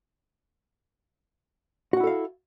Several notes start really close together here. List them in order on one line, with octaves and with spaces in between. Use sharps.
F#4 F#5 E4 A4 F5